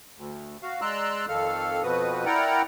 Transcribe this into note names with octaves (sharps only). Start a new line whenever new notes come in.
D2
F#4 F5
G#3 D5 A#5 C6 E6 F#6
F2 D#3 A4 F5 F6
F2 B2 F3 F#4 B4 D#6
E4 A#4 D5 F#5 G5 A#5